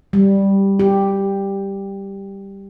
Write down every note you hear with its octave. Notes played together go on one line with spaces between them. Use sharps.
G3
G4